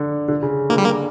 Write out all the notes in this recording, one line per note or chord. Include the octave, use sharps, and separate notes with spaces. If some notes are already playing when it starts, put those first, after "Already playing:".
Already playing: D3
D3
C#3
D3 A#3
G3
A#3